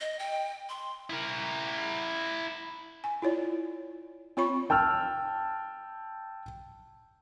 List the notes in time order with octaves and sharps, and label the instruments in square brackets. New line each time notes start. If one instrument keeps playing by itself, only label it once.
[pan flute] D#5
G5
C6
[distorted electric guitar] E4 A#4
[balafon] G#5
E4 F4 C#5 D5
C4 F4 C#5 B5 C#6
[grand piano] G5 A5 E6 F6